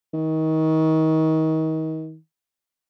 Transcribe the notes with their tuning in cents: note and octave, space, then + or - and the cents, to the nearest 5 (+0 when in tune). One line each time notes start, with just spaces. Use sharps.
D#3 +30